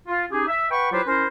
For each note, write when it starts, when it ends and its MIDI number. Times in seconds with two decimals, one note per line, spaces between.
0.08 0.25 65
0.31 0.45 61
0.31 0.45 63
0.31 0.45 67
0.31 0.45 68
0.48 0.66 76
0.71 0.89 71
0.71 0.89 78
0.71 0.89 79
0.71 0.89 83
0.71 0.89 85
0.92 1.02 54
0.92 1.02 64
0.92 1.02 65
0.92 1.02 67
0.92 1.02 71
0.92 1.02 72
1.07 1.27 61
1.07 1.27 64
1.07 1.27 70
1.07 1.27 72